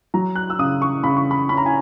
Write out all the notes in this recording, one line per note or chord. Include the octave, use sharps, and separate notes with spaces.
F#3 A#5
F#6
E6
C#3 D#6
C#6
C#3 B5
C#6
B5
C#4 B5
A#5
G#5